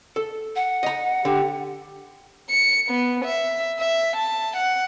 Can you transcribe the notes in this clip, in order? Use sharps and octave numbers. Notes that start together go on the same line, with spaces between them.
A4
F#5
D#5 A#5
D3 G4
C#7
B3
E5
E5
A5
F#5